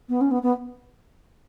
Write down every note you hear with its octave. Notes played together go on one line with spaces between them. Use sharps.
B3
C#4
B3
B3